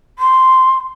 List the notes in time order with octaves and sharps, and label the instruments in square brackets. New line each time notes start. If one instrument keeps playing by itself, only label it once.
[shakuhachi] C6